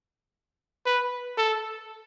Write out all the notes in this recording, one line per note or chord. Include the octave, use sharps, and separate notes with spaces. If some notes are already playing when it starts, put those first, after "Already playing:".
B4
A4